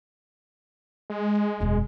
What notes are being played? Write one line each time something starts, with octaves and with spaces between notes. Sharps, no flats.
G#3
E1 F#2